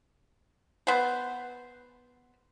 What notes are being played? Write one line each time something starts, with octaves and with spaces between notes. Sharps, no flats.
B3 C5